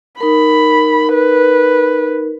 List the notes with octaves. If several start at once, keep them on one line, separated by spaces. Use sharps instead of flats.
D#4 A#4 B5
B4